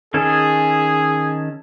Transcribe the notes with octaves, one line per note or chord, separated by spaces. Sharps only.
D#3 C#4 G#4 A4